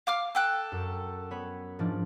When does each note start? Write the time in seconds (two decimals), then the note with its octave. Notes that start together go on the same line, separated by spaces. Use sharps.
0.07 F5 D6 F6
0.35 A4 G5 F#6
0.72 F#2
1.31 B3 C#5 B5
1.79 G#2 F3 D4